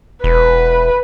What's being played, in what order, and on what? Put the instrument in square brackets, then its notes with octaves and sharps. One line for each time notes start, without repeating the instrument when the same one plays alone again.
[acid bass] E1 [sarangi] B4